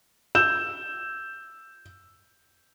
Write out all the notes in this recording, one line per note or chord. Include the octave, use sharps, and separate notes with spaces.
E6 G6 E7